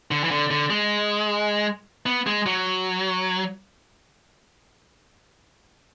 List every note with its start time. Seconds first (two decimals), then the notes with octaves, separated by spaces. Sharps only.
0.11 D3
0.24 E3
0.31 D3
0.51 D3
0.70 G#3
2.06 B3
2.27 G#3
2.46 F#3